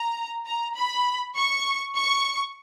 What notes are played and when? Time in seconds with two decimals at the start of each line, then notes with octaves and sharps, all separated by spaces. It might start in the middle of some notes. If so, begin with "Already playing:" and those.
Already playing: A#5
0.46 A#5
0.75 B5
1.36 C#6
1.95 C#6